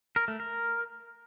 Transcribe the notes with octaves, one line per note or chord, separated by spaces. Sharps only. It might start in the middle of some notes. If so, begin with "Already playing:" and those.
A#4
A3
A#4